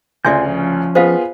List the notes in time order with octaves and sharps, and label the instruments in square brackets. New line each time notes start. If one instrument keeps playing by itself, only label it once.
[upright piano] D2 C#3 [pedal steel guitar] F4 C6 G6 [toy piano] D5 E5 G#5
[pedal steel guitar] F3 C#4
[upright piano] B3 F4 G#4 [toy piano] C5 D#5 F5